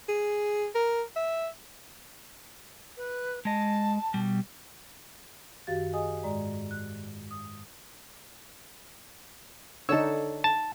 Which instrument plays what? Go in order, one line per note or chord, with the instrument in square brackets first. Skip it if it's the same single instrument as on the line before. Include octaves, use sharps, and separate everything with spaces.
[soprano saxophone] G#4
A#4
E5
[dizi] B4
[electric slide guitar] G#3 D#5 [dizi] A5
[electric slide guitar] B2 G3
[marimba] F#2 D#3 F#4 G4 F5 A6
G#4 D#5 G#5 D#6
G#2 G#3 D5 A#5
F#6
D#6
[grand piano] D3 [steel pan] D#4 E6 [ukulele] A4 C#5
[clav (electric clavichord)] A5